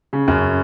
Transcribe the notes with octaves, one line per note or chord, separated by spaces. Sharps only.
C#3
F#2